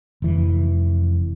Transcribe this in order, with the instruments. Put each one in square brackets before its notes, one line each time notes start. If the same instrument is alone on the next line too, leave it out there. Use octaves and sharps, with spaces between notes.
[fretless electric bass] F1 E3